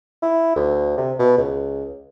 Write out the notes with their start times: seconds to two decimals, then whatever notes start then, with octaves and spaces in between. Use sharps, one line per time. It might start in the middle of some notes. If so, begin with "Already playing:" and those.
0.22 E4
0.56 D2
0.97 C3
1.19 B2
1.38 C#2